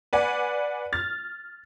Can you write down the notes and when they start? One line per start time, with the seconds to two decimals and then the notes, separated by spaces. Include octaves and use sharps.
0.13 B4 D5 F#5 G#5
0.93 F6 A6